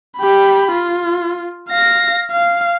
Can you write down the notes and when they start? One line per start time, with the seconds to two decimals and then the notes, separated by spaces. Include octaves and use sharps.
0.18 G4 B5
0.72 F4
1.70 F5 A#6
2.32 F5